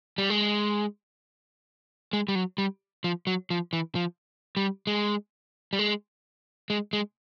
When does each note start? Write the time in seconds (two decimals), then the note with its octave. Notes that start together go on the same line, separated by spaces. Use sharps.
0.18 G3
0.30 G#3
2.13 G#3
2.28 G3
2.35 F#3
2.58 G3
3.04 F3
3.27 F#3
3.50 F3
3.73 E3
3.95 F3
4.57 G3
4.87 G#3
5.73 G3
5.79 G#3
6.70 G#3
6.93 G#3